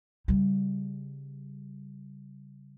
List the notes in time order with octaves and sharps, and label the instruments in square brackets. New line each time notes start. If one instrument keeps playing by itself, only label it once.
[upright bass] C#3 G3